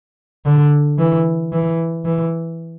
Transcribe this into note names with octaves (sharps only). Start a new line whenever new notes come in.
D3
E3
E3
E3